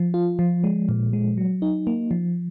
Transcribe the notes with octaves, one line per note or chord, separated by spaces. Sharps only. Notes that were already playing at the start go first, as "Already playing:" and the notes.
Already playing: F3
F4
F3
G#3
A#2
G#3
F#3
D#4
A#3
F3